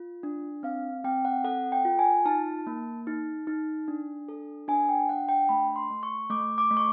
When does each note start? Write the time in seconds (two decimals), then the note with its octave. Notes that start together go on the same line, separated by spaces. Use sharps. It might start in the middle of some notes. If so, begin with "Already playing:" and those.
Already playing: F4
0.23 D4
0.63 C4 F5
1.04 C4 G5
1.25 F#5
1.44 A4 F#5
1.72 G5
1.85 F4
1.99 G#5
2.25 D#4 A5
2.67 A#3
3.07 D#4
3.47 D#4
3.88 D4
4.29 A4
4.68 D4 G#5
4.89 G5
5.09 D4 F#5
5.29 G5
5.49 A3 B5
5.76 C6
5.90 A3
6.03 C#6
6.30 A3 D6
6.58 D6
6.71 A3
6.77 C#6